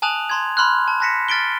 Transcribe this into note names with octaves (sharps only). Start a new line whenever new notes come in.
G#5 A5 D#6 F#6 F7 F#7
A#5 C6 G#6
B5 C6 F6 F#6
A5
A5 F#6 A#6 B6 C#7 E7
F6 A6 B6 D7 G7